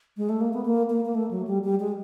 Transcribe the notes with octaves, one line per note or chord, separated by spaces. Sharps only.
G#3
A3
A#3
B3
A#3
A#3
A#3
A3
F#3
G3
G3
G#3